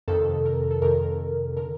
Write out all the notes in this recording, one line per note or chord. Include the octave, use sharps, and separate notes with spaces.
F2 C3 D#3 A4
A#4
A4
F2 C3 D#3 A#4
D3 A#4